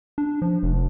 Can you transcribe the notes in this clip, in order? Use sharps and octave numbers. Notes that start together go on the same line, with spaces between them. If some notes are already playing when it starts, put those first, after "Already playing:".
D4
F3
F1